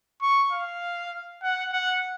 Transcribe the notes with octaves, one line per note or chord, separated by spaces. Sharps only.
C#6
F5
F#5
F#5